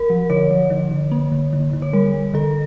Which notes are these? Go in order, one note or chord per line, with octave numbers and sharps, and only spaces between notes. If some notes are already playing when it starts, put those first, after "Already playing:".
Already playing: A#4
F3
D3 C#5
F3
D3
D3
A#3
D3
D3
D3
C#5
G3 A#4
G3
D3 A4